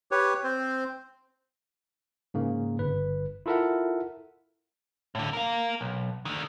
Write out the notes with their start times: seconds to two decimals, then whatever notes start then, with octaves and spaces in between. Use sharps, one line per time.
0.11 G4 B4 C#5
0.44 C4 C5
2.34 G#2 C#3 A#3
2.79 G1 B4
3.46 E4 F4 A4 A#4 E5 F#5
5.15 A2 D3
5.33 A#4 F5
5.81 B1
6.25 D3 D#3